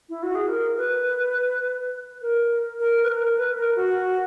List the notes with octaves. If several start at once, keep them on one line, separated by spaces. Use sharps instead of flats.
E4
F#4
G#4
A#4
B4
A#4
A#4
B4
A#4
B4
A#4
F#4